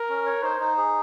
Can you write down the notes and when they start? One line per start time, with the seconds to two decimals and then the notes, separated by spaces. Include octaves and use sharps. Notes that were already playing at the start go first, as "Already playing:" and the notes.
Already playing: A#4
0.09 C#4
0.26 C#5
0.43 D#4 C5
0.60 D#4
0.78 G#4